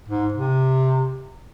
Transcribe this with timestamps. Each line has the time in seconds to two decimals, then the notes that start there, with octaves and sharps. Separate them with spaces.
0.08 G#2
0.34 C3